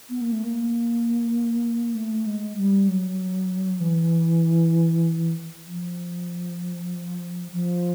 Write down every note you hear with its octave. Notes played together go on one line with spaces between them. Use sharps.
B3
A#3
A3
A#3
A3
G#3
G3
F#3
E3
F3
F3